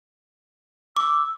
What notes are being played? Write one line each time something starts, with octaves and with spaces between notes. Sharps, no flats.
D6 E6